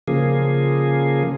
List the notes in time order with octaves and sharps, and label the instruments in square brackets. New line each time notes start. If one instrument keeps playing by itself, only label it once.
[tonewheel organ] C#3 F3 A#3 G#4